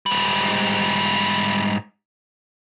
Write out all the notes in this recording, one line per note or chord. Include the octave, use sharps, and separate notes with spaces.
G#2 G3